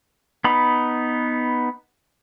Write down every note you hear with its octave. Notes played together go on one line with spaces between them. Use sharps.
B3 D#4 B5